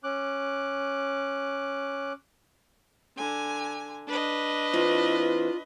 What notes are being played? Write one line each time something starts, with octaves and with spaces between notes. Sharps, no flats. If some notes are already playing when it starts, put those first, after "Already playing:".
C#4 D6 F#6
D3 G#5
D4 B4 D#5
E3 C4 F4